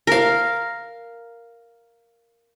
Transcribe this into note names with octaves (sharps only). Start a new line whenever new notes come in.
A#4 F5